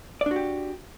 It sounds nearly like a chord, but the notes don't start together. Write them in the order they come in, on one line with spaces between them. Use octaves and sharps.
D5 D4 F#4 G4